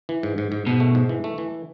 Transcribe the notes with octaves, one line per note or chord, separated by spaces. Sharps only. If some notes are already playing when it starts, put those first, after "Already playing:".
E3
G#2
G#2
G#2
G#2 B2
A3
G#2
E3
A3
E3